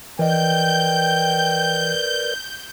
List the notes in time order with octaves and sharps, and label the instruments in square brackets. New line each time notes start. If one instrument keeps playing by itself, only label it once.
[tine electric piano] E3 D#5 [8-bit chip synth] A#4 B4 D5 [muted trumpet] G5 [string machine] G6